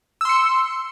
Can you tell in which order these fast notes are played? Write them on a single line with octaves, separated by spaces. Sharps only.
E6 C6 C#7